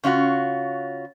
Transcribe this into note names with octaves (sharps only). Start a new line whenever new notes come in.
C#3 C#4 F4 F#4